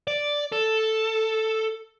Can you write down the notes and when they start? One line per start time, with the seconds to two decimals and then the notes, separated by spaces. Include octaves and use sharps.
0.08 D5
0.53 A4